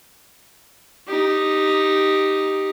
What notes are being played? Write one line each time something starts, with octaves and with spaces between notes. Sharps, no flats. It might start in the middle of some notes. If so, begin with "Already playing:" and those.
D#4 G4